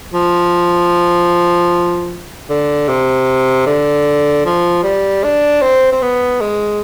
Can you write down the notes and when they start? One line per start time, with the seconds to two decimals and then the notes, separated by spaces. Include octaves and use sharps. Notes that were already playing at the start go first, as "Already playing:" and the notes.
0.14 F3
2.50 D3
2.88 C3
3.66 D3
4.45 F3
4.83 G3
5.24 D4
5.62 C4
5.92 C4
6.02 B3
6.41 G#3